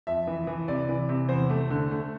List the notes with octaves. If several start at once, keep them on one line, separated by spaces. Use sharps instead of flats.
F2 E5
E3
E3
C3 D5
E3
C3
E2 C5
A3
D3
A3